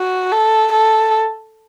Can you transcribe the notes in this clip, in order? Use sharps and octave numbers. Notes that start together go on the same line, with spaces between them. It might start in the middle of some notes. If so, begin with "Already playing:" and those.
Already playing: F#4
A4
A4